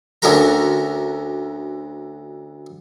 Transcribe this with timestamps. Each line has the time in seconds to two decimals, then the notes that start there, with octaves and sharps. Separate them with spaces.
0.22 D2 D3 C#4 F#4 A#4 A#5